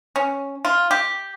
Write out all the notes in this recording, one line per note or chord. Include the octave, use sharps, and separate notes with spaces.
C#4
F4
G4